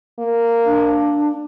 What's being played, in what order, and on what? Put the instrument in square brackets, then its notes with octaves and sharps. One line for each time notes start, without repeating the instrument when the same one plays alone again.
[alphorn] A#3
[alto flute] D4